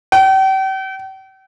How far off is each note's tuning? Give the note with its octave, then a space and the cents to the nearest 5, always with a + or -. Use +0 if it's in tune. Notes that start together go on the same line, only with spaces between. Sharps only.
G5 -40